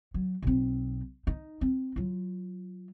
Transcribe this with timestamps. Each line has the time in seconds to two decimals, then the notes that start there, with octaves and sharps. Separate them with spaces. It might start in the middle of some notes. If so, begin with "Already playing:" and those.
0.14 F#3
0.42 B1 C4
1.27 D#4
1.61 C4
1.96 F#3 F4